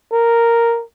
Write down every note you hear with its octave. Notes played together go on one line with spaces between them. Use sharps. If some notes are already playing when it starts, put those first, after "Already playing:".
A#4